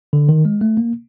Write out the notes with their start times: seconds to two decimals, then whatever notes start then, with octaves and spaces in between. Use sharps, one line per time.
0.13 D3
0.29 D#3
0.45 G#3
0.61 A3
0.77 A#3